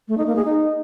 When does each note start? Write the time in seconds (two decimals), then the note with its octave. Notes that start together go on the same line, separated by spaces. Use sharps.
0.08 A3
0.17 D#4
0.27 A#3
0.36 G#4
0.45 D#4